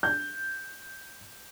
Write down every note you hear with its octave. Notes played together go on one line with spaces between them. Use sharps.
G6